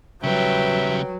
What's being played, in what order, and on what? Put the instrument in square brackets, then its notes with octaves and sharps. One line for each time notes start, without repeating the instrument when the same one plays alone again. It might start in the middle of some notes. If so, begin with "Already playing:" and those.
[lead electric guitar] C#3 G3 [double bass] F#3 [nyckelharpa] B4 G5 [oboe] E5